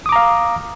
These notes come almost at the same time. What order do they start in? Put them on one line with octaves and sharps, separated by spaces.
D#6 D6 A#5 F5